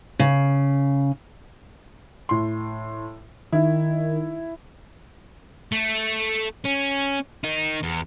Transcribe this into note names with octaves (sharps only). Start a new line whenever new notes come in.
C#3
A2 C6
D#3 E4
A3
C#4
D#3 D#4
E2